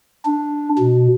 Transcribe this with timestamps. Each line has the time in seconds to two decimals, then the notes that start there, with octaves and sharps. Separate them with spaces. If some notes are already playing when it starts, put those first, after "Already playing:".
0.25 D4
0.79 B2